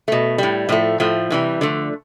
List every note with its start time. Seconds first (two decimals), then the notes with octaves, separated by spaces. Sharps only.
0.08 B2 A3
0.38 A2 G3
0.69 A2 F3 A3
1.00 A2 F3 A3
1.30 C3 E3 G3
1.61 D3 F3 A3